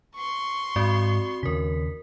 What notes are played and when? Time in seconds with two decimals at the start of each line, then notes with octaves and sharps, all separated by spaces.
0.15 C6 C#6
0.76 G#2 C4 F#4 D5
1.43 D#2 C#3 A#4 B6